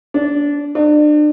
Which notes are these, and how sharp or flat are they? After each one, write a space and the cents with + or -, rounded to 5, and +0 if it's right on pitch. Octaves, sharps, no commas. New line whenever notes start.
D4 -20
D4 +35